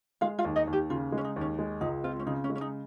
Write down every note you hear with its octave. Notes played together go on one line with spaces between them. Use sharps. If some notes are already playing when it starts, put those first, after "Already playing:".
G#3 F4 F5
F4 F5
D#2
D#4 D#5
D#2
G4
C#3 F4
G#3
C#4
D#4
D#2
C#4
G#3
C#2 D#4
C4 F4
C#4
C#3 D#4
C#4
G#3
C#4
D#4